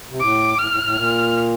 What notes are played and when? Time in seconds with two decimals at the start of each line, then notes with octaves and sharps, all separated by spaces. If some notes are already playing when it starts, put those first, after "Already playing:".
0.11 C3
0.20 A2 D6
0.58 A2 F6
0.71 A2
0.83 A2
0.96 A#2